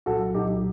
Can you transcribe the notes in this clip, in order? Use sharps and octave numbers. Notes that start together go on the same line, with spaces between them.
C2 A#2 F#3 F#4 A4
C2 A#2 F#3 D#4 G4